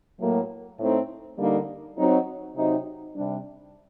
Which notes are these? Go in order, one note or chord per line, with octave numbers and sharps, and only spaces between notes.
A2 F#3 A#3
A2 A3 C4 D#4
D3 G3 A#3 D#4
F#3 C4 D#4
C3 F#3 C4 D#4
C3 G3 D4